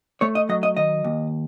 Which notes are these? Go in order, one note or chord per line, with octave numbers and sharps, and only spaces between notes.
A3 C#5
D#5
F#3 D#5
D#5
D#3 D#5
D#2